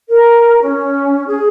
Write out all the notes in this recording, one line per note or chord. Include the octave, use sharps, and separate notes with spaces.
A#4
C#4
G#4